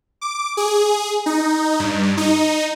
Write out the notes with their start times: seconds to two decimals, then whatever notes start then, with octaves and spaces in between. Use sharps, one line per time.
0.21 D6
0.57 G#4
1.26 D#4
1.79 G2
2.17 D#4